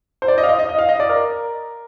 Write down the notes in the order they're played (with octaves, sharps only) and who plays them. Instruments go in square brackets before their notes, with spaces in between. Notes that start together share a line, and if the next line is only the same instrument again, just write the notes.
[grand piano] C5
D5
D#5
F5
D#5
D#5
D#5
F5
D#5
D5
A#4